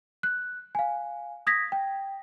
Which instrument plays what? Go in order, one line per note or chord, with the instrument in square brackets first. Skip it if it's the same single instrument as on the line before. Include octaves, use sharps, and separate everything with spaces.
[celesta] F#6
F5 G#5
D#6 G#6 A#6 B6
G5